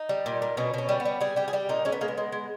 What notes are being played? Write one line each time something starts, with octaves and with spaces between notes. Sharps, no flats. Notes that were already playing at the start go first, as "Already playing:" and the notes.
Already playing: D#4
G3
A#2
A#2
B2 C#4
B2 C#4
G3
B3
G3
G3 G#4
G3 G4
G#4
G3 G4
A#2 D#4
G#3 C#4
B3
G#3 A#3
B3
G#3
G#3